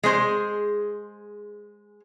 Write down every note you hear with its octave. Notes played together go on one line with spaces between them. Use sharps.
G#3 G#4 C5